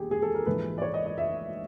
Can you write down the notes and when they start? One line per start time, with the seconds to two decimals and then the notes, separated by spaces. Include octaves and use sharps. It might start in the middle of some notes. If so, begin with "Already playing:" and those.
Already playing: E1 D#2 G4 G#4
0.11 G#4
0.22 A4
0.35 A#4
0.46 A#1 G#2 E3 G#3 B4
0.78 D5
0.82 C#5
0.94 D#5
1.06 D#5
1.18 E5